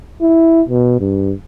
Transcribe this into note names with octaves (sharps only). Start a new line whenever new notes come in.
E4
B2
G2